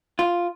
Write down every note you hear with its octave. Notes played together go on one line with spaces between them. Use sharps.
F4